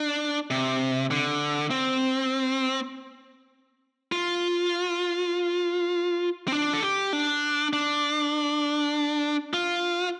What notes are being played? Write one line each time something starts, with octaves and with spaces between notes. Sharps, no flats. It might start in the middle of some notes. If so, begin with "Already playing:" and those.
Already playing: D4
C3
D3
C4
F4
C4
D4
A4
G4
D4
D4
F4